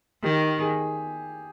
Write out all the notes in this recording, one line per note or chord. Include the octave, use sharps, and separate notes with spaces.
D#3 G4
G#4